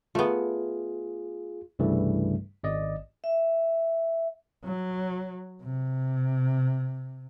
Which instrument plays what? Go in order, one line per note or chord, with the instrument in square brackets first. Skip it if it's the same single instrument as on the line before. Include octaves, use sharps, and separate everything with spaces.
[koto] A3 B3 [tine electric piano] F4 G#4
[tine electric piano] C2 G2 C#3 E3 G3 A3
G#1 D5 D#5
[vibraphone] E5
[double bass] F#3
C3